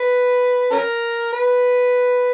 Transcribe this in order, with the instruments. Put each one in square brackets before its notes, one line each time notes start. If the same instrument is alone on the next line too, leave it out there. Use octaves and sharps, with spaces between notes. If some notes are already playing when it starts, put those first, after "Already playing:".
Already playing: [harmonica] B4
C#4 A#4
B4